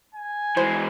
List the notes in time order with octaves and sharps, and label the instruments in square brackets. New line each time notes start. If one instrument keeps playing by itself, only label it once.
[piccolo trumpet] G#5
[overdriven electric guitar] E3 G#3 [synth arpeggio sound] C5